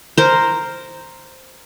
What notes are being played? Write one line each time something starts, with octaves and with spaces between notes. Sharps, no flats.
A#4 C5